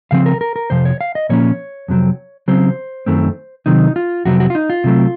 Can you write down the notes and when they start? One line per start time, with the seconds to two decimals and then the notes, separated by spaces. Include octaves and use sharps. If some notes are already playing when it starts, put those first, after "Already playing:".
0.11 C#3 F3 C4 F5
0.26 A#4
0.41 A#4
0.56 A#4
0.70 F2 C3 F3 C5
0.85 C#5
1.01 F5
1.15 D#5
1.29 A#2 F3 A#3 C#4 C#5
1.88 F2 C3 F#3 C4
2.48 C#3 F#3 C4 C5
3.06 F#2 D#3 F#3 A3 C4
3.66 C3 D#3 F#3 C4 D#4
3.96 F4
4.25 F2 C3 F#3 C4 F#4
4.40 F#4
4.50 F4
4.55 D#4
4.70 F4
4.84 C3 F#3 A3 C4